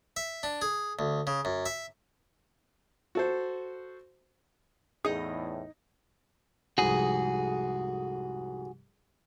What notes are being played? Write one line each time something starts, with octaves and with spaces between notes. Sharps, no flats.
E5
D4
G#4
D2
C#3
F#2
E5
F#4 A4 C5
E2 A2 D#4 G#4 D#5
C2 F2 G#2 F#4 G#4